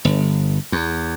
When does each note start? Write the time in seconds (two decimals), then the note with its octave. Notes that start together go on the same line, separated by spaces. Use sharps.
0.05 G1
0.72 E2